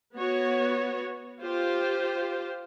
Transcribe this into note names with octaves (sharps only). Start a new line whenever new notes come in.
B3 F#4 C#5
F4 G4 C5